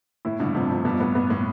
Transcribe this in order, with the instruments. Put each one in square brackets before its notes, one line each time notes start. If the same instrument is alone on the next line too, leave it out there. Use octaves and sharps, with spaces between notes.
[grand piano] A2 [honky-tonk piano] E4
[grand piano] G2 B2 [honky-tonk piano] D3
[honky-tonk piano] F2 [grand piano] A2 C3
[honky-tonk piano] F2
[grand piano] G2 B2 [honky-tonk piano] B3
[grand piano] A2 [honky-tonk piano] B3
[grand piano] G2 [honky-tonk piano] B3
[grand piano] A2 [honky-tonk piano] B3